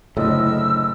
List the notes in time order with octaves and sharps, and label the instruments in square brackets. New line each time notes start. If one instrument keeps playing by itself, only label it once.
[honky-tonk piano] F#1 D3 D#5 [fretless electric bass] A2 [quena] E6